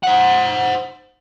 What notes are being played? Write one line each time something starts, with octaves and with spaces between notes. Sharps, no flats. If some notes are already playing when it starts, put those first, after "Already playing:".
C5 F#5